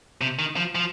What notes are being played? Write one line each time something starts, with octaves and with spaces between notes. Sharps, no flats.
C3
D#3
F3
F3